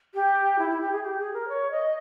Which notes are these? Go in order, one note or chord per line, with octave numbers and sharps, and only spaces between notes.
G4
E4
E4
G4
G#4
G4
G#4
A#4
C#5
D#5